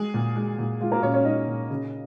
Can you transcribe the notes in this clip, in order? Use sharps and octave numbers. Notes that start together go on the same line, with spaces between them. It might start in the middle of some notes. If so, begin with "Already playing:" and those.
Already playing: G#3 G#4
A#2
G#3
A#2
G#3 F4
A#3 A#4
A#2 C#4 C#5
C#4 C#5
G#3 D#4 D#5
A#2
C#3